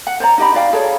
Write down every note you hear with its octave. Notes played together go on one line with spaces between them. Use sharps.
F#5
C5 D5 A#5
D#4 G4 D#5 B5
F#4 D5 F5 G5
G#4 A4 C#5